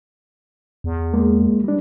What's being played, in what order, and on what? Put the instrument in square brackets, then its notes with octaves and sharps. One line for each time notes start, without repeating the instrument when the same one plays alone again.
[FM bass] E2
[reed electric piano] G#3 A#3
G3 D4